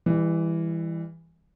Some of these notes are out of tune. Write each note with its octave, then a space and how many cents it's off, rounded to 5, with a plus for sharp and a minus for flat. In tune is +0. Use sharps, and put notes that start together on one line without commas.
E3 +0 G3 +35